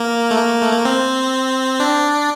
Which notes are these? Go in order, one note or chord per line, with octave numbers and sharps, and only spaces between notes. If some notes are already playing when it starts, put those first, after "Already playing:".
Already playing: A#3
A3
A#3
A3
A#3
C4
D4